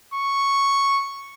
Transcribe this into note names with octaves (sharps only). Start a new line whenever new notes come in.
C#6